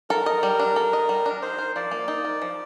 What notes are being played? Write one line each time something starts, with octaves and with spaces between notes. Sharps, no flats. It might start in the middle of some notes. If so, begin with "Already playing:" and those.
A4 A#4
D#5
G3
D4
A4
D#5
G3
D4
D#4 C5
A#4
F3 D5
A#3
D#4
A#4
F3